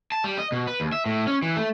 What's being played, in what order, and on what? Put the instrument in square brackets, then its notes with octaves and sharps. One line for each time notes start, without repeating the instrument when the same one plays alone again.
[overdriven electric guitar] A5
G3
D#5
B2
B4
D#2
E5
A2
C#4
E3
A3